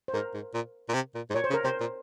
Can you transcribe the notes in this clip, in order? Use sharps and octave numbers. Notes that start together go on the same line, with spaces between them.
C5
G#2 A#4
G#2
A#2
A#2
C3
A#2
G#2
A#2 C#5
C5
C#3
A#4
C3 C5
A#2